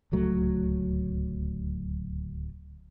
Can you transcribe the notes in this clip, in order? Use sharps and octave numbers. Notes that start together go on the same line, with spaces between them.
D1 C#2 F#3 A3